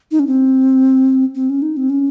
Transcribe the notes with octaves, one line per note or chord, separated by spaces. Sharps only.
D#4
C#4
C4
C4
C#4
D#4
C4
C#4